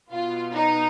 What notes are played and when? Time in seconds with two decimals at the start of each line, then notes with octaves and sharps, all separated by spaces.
0.11 B2 B3 F4
0.54 D#4